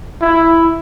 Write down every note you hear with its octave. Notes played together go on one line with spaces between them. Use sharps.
E4